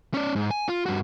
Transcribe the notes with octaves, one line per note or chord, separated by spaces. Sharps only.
C#4 D5
G#2
G#5
F4
G2 F#4